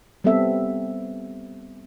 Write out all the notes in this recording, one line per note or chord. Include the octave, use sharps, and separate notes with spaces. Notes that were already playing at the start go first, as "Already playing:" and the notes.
G3 B3 C4 A4 E5